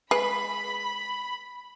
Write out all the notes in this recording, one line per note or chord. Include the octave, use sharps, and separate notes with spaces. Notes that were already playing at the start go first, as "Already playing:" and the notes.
G#3 B4 B5